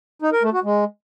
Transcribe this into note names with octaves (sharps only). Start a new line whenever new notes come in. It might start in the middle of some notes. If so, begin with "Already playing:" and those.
D#4
A#4
A3
F#4
G#3